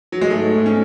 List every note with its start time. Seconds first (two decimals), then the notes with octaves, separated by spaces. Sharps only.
0.12 F#3
0.21 G#3
0.30 G#2 A3
0.54 G#2
0.66 C#4